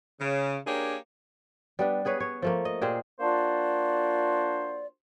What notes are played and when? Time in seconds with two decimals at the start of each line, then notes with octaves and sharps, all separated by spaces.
0.20 C#3
0.67 A#3 D4 G4 G#4 A#4 C#5
1.79 G3 B3 D4
2.05 B3 G#4 B4 C#5
2.20 C#5
2.42 F3 A3 A#3
2.65 D#5
2.82 A#2 G4 G#4 C5
3.20 A#3 D4 F4 F#4 C5 D5